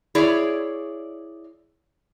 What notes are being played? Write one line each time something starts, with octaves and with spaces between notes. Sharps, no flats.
E4 G#4 C#5 D5